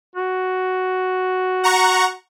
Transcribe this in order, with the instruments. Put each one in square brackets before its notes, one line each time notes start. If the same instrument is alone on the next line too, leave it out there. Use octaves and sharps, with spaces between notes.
[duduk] F#4
[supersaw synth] F#5 A#5 C#6